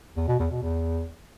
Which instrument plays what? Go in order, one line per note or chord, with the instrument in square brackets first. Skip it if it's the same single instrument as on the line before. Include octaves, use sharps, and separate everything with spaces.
[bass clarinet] E2
B2
E2
B2
E2